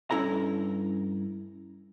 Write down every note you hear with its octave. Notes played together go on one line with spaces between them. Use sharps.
G2 C#4 E4 A4 A#5